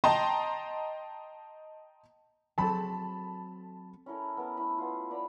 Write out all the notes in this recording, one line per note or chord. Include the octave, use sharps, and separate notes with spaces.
D#5 G5 A5 A#5 C6
F#3 C4 A4 A5 B5
C#4 E4 A4 A#4
B3 A#4
A3 E4 B5 D#6
B3 E4 F4
B4 D5 A#5 B5